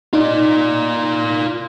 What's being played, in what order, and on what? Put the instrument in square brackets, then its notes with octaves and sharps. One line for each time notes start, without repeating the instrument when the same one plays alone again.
[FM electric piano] D#4 [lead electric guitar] F4 D5